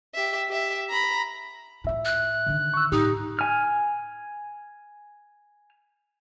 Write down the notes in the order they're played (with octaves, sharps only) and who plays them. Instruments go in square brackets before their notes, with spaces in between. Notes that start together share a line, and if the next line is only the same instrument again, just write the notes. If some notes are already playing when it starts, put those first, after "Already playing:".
[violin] G4 E5
G4 E5
A#5 B5
[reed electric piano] A2 E5 [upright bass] D#4 F4
[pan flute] F#6
[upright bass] D3 D#3
[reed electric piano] C#6 E6
[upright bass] A2 [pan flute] D#4 [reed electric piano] G4 D#6
[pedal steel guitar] G#5 F6